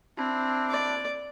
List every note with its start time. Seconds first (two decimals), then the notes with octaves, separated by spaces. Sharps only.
0.18 C4 D4 E4
0.70 D5